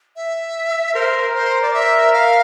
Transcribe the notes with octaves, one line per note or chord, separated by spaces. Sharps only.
E5
A#4 C5
C5
D5
E5
F5